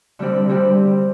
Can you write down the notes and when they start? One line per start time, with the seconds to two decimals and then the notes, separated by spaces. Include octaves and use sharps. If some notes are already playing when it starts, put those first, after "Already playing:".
0.19 D3 G3 C4 G4 D5
0.49 D3 G3 C4 G4 D5